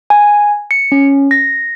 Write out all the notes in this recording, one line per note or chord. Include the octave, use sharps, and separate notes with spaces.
G#5
C#7
C#4
A#6